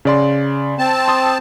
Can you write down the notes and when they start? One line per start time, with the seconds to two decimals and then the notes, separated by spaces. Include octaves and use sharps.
0.05 C#3 D5 C6
0.79 C4 A5
1.08 C6 D#6